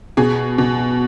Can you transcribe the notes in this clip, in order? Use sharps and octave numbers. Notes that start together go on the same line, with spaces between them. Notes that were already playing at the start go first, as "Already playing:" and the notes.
B2 G#4 G#5
B2